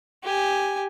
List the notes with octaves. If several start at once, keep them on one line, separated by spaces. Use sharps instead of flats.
G4 G#5